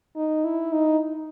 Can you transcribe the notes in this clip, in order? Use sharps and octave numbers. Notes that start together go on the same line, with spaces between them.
D#4
E4
D#4